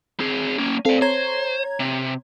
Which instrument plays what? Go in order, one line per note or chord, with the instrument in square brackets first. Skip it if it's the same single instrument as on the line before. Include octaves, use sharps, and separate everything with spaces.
[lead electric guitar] C4 G#4
A#3 C#4
[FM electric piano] C4 A4 [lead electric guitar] D5 F5
[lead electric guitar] C5 [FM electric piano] C#5 A#5 G#6
[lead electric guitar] C3